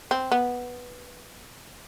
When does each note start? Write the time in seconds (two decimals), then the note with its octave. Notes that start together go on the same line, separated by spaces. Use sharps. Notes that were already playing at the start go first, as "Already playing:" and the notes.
0.11 C4
0.32 B3